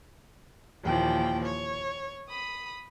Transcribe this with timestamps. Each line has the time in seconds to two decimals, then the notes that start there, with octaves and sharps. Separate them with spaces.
0.83 D#2 A#2 E3 F3 G5
1.45 C#5
2.27 B5 D#6